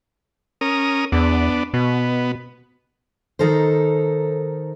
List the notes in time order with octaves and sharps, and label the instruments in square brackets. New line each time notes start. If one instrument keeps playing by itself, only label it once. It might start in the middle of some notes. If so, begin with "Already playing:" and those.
[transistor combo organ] C#4 A#4 D#6
[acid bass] E2 [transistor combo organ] B3 D4
[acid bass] B2 [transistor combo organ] B3
[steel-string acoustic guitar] D#3 D#4 A4 A#4 C5